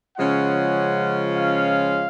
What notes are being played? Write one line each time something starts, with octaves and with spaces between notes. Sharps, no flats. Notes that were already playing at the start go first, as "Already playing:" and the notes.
C#3 F3 G#3 C#4 F4 F#5
F5